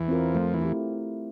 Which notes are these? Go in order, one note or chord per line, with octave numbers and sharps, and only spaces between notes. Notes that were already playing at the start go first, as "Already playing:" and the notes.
Already playing: E2 E3
C4 F4 A#4
F2 F3 A3
E2 E3
E4 G4